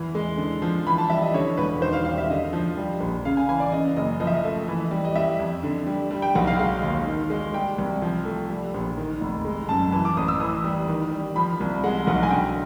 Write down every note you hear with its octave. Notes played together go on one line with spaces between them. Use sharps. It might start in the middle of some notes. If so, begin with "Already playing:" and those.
Already playing: E2 E3
G#3
D3
F3
E3 B5
A5
G3 E5
D#5
D3 C#5
E1 B4
D#3 C5
F5
G3 F5
E5
D3 D#5
F3
G3
A#1
C#3 F5
G#5
E3 G#5
D5
C#3 D#5
F#1 D#5
F3 D#5
E5
D#5
A3
E3
G3
D#5
G3 E5
F2
D3
G3
G3
G5
B1 F#5
F5
G#3 F5
D#2
D#3
G#3
G3 G5
C2
F3
A3
G3
A#1
D#3
F1
G#3
F#2 A5
E3 A5
D6
A1 D#6
E6
E3 D#6
G3
D#3
G3
F3 B5
C2
G#3 F#5
B1 F#5
G#5
D3 G5